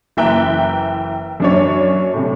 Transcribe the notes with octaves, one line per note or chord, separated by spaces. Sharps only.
F#1 E3 E5 G5 A#5 F#6
F#2 D4 C#5
A2 C3